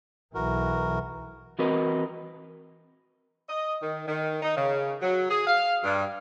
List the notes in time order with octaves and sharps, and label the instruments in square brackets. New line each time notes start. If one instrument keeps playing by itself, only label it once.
[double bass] B1 E3 [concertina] F#4 A#4
[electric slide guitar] E3 C4 F#4 A#4 B4 D#5
[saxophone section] D#5
D#3
D#3
D#4
C#3
F#3
G#4
F5
G2